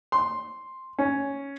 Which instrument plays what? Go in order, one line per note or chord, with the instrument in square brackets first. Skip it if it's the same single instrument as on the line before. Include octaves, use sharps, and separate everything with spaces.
[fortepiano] C6
C#4